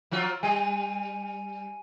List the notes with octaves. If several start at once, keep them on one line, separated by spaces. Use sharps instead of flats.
F3 F#3 F4
G3 G#5 D#7